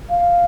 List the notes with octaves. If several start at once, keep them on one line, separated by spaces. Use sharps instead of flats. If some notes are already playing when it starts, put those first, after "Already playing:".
F5